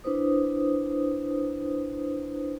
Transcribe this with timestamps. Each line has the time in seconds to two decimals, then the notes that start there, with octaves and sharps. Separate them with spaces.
0.04 D4 E4 B4 C5 D#6